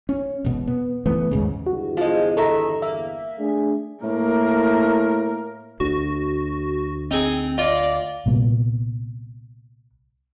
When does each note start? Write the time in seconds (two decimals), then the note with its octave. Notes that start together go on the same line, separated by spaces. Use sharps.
0.09 C#4
0.45 E1 B2
0.68 B3
1.06 E3 A3 B3
1.31 D#2 G#2 C#3
1.66 G1 E2 F#4
1.97 F3 G#3 F4
2.37 D#3 A4 E5 A#5
2.82 A#3 E5
3.39 A3 D4 G#4
4.03 A2 A#3 A#4
5.80 D2 D3 F#4
7.11 C4 D#4 G#4
7.58 F4 D5 D#5
8.26 C2 A#2 B3